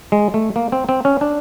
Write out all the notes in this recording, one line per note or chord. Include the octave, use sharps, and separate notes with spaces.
G#3
A3
A#3
C4
C4
C#4
D4